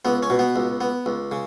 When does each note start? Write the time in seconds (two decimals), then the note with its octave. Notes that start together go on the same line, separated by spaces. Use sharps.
0.05 C#2 B3
0.23 C#4
0.30 B2
0.39 B3
0.56 C#2
0.81 B3
1.06 C#2
1.32 C#3